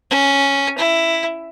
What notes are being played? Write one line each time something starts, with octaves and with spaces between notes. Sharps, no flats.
C#4
E4